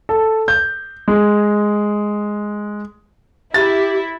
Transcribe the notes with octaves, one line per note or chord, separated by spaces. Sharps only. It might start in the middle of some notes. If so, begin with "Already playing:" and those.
A4
G6
G#3
E4 G4 A6